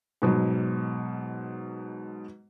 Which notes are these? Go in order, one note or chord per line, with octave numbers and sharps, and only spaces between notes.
G#2 B2 F#3